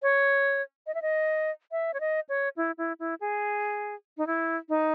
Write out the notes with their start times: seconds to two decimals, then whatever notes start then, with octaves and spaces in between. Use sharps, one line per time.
0.02 C#5
0.87 D#5
0.95 E5
1.02 D#5
1.71 E5
1.94 C#5
2.00 D#5
2.29 C#5
2.57 E4
2.78 E4
3.00 E4
3.21 G#4
4.18 D#4
4.27 E4
4.69 D#4